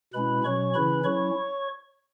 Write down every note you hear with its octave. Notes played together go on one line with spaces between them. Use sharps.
B2 G#3 C#4 E4 B4 B5
B2 F#3 C#4 C#5 C#6
C#3 E3 C#4 E4 B4 B5
F#3 C#4 E4 C#5 C#6